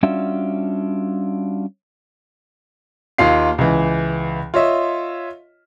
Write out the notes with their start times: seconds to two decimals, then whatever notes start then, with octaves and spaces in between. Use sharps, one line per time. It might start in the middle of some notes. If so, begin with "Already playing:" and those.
0.03 G3 C#4 D4 F4 F#4 E5
3.18 D#2 A#3 D#4 F4 F5 C7
3.58 C#2 E3
4.54 F4 C#5 D#5 E5